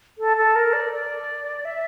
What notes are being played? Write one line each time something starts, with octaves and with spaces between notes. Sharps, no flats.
A4
A4
A#4
D5
D5
E5